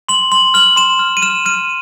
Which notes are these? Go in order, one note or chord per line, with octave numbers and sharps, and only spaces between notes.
C6 F#7
C6 F#7
F6 F#7
C6 E7
F6
D#7
F6 E7
F6 D#7